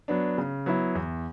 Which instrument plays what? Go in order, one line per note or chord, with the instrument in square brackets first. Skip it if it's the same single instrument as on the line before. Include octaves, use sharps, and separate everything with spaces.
[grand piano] F#3 B3 D4
C#3
F#3 B3 E4
E2